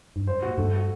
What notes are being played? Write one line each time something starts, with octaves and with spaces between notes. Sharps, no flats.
G2
F#2 C5
A#2 F#4
A2
G2 A3
F#4